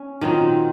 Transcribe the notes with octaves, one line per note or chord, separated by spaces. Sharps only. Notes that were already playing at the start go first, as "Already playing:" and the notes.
Already playing: C#4
A#2 D#3 F#3 C4 D#4